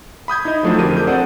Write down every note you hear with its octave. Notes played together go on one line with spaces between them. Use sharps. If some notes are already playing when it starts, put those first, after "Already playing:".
B5 D#6 G6 G#6
D#4 E4 D#5
F3 F#3 A3 D4 F4 C5
F2 D3 G4 A#4 D#7
G#4 G6
C4 A4 C5 D5 F#5